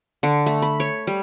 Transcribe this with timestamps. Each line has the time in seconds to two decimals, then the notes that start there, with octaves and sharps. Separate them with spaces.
0.23 D3
0.46 A3
0.62 B5
0.80 C#5
1.07 G3